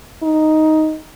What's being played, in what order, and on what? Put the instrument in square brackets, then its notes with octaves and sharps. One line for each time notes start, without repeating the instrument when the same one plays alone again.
[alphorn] D#4